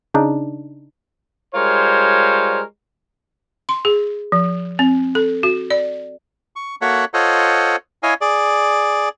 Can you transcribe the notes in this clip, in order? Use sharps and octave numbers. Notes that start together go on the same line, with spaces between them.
C#3 D4 D#4
G3 G#3 F4 A#4 C5 C#5
C6
G#4
F3
C4
A4
F#4
D5
C#6
A#3 F#4 A4 C#5 E5 F#5
F4 A4 C5 C#5 D#5 F#5
E4 C#5 D#5 F5 G#5
G#4 D5